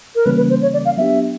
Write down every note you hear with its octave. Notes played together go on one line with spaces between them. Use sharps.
A#4
C#3 E3 G3 A#3 C#4 B4
B4
C5
C#5
D5
F5
F#3 B3 D4 G4 E5